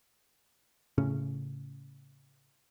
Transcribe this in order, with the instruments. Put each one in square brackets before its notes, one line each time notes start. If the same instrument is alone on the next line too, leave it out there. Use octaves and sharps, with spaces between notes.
[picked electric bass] A2 C#3 C#4